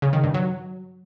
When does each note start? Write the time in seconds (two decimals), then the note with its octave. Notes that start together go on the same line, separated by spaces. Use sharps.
0.02 C#3
0.13 D#3
0.24 G2
0.34 F#3